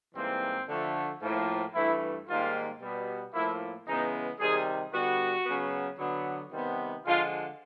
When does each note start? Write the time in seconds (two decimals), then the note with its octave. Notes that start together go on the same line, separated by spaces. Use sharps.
0.15 G#2 E3 G3 A#3 C4
0.68 D3 F3 A3
1.22 A2 F3 A#3
1.74 G2 E3 A3 E4
2.27 G#2 D#3 G3 A#3 F4
2.81 B2 G3 B3
3.33 A2 F3 A#3 E4
3.87 C#3 E3 G#3 B3 D#4
4.40 C3 D#3 G3 G#4
4.93 D3 G3 B3 F#4
5.46 C#3 F#3 B3
5.99 D3 F#3 B3
6.52 C3 D#3 G3 B3
7.05 D3 F3 G#3 F4